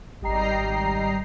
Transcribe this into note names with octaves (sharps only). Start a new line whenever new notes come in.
G#1 G3 D#5 G5 A#5 C7